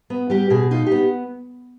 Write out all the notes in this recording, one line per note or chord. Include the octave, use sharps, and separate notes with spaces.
B3
G3 G4
B2 G#4
D#4 F4
B3 G4